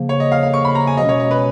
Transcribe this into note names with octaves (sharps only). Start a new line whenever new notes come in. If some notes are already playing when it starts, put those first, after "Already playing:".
Already playing: C#3 F3 A#3
C#5
D#5
F5
F5
C#6
B5
A#5
G#5
B2 G#3 C#4 D#5
C#5
D#5
B4